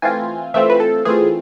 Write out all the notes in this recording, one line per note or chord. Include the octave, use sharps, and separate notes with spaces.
E3 A3 C4 F4 G#5
E3 A3 C4 F4 E5
B4
A4
E3 A3 C4 F4 G#4